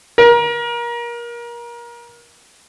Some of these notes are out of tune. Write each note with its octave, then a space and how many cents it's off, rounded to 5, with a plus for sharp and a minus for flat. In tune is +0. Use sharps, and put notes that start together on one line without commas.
A#4 +25